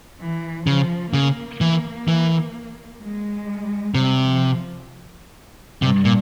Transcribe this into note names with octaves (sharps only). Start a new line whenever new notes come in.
E3
C#3 F3
C#3 A#3
E3
E3
G#3
C3 G3
F3
G2 C3
A#2